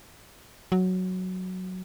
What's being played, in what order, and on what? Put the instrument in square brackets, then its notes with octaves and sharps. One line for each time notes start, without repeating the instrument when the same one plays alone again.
[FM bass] F#3